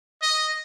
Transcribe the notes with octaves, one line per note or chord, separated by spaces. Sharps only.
D#5